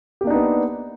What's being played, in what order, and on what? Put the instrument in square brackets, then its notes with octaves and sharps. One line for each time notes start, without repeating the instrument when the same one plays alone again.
[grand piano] G4
A#3
D4
D#4
B3